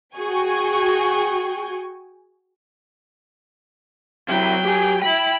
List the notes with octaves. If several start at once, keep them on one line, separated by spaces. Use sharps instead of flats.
F#4 G#4 G5 G#5 C#6
C3 F#3 E4 G5
G4 G#5
E4 G5 B5